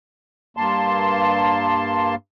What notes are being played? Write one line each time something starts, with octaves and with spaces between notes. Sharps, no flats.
G2 A#3 A5 C6